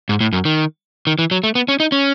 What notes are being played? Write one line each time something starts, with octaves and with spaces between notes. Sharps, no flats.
G#2
A2
F#2
D#3
D#3
E3
F#3
A3
B3
C#4
D#4
C#4